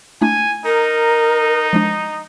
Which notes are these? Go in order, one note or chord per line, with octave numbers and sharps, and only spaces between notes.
A3 D4 E4 G#5
D#4 A#4
F3 G#3 D4